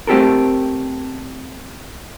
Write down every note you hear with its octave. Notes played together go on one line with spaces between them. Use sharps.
A3 C4 G4 A4 A#4